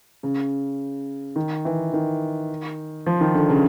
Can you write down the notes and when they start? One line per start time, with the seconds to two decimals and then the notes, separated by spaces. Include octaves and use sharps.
0.23 C#3
1.36 D#3
1.65 E3
1.93 D#3
3.06 F3
3.21 D#3
3.34 D3
3.49 C#3